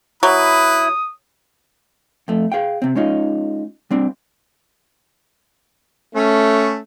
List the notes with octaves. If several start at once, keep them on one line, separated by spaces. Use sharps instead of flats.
F#3 E4 B4 D#6
F2 A3
G#4 F5 G5
C3 C4
G#3 C#4 D#4 F4
G3 C4 D4
A3 C#4